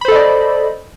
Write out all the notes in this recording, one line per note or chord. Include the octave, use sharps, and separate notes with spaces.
A4 C5 D5 D#5 B5